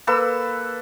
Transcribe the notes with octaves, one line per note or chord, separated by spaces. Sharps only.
A#3 A4 B4 E6